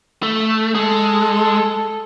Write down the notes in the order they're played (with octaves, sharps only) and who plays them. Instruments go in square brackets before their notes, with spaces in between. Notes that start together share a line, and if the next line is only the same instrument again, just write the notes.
[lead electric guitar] A3
[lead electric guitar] G#3 [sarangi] A4